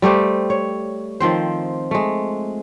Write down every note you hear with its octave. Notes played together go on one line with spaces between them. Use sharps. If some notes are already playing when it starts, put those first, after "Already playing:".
G3 A3 G4 C5
C#5
D#3 F3 C4 C5
G#3 A3